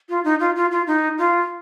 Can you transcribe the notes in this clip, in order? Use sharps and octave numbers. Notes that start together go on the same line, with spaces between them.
F4
D#4
F4
F4
F4
D#4
F4